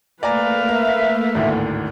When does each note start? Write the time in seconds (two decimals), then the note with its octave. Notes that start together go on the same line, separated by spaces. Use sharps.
0.23 A3 A#3 B4 D5 F5 G#5 A#5
0.69 A#4 E5
1.35 G#1 D2 A2